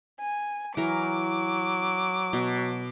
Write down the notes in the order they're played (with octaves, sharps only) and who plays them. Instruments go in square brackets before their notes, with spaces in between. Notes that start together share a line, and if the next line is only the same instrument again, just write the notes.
[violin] G#5
[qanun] E3 A#4 [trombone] F#3 [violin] D6
[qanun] B2